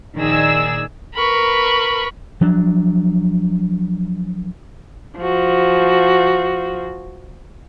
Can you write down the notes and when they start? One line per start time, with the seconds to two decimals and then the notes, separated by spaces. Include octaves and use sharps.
0.17 A#1 D#3 G#4 D5 E6
1.14 A#4 B4 B5 C#6
2.41 F3 F#3 D4
5.19 F3 F#4